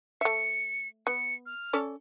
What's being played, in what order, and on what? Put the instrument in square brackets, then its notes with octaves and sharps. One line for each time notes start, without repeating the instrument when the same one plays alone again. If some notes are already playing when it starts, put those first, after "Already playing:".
[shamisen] A3 E5 [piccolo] C#7
[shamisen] B3 [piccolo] C#7
[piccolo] F6
[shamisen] C#4 A4 D5